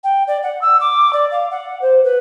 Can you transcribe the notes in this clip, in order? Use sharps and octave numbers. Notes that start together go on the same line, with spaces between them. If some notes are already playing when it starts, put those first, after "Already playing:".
G5
D5
F#5
E6
D6
D5
F5
F#5
C5
B4